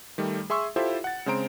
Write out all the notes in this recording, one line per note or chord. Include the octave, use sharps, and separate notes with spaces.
D#3 G3 A3
G#4 E5 C6 C#6 E6
E4 F4 G4 A4 C5 E5
F#5 A6
C#3 G#3 C4 C5 A#5 D7